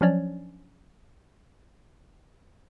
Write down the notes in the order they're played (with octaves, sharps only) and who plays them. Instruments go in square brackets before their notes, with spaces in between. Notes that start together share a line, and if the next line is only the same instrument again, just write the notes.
[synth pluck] F3 F#3 C#4 D4 C#5 D5